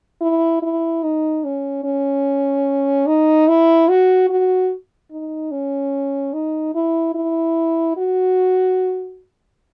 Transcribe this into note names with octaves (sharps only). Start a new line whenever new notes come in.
E4
E4
D#4
C#4
C#4
D#4
E4
F#4
F#4
D#4
C#4
D#4
E4
E4
F#4